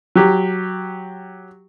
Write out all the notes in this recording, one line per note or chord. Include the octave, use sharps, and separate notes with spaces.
F#3 G4